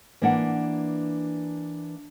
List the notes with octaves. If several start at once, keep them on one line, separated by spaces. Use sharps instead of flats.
E3 A#3 D4 F#5